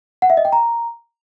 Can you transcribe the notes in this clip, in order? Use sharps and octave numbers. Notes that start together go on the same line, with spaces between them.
F#5
E5
D#5
G5
A#5